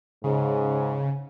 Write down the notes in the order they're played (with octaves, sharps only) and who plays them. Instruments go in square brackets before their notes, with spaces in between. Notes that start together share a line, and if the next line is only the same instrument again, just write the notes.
[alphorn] G#2 [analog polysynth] C#3